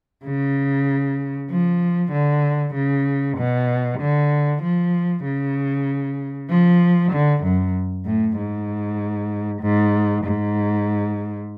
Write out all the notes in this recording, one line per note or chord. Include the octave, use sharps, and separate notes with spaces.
C#3
F3
D3
C#3
B2
D3
F3
C#3
F3
D3
F#2
A2
G#2
G#2
G#2